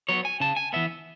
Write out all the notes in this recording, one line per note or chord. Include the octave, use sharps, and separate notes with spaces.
F#3 B3 C#5
G#5
C#3 A5
G#5
E3 B3 E5